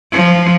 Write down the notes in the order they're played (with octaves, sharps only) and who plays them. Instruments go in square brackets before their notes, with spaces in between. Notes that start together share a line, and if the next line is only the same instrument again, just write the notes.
[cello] F3